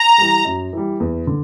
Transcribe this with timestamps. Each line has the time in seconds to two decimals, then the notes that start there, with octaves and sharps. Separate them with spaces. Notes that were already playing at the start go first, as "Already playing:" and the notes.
Already playing: A#5
0.18 E3 G3
0.45 F#2
0.73 E3 G3
1.00 E2
1.27 D3